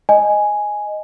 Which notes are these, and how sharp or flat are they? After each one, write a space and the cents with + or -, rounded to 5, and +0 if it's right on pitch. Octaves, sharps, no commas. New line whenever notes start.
D#5 +0 G#5 +0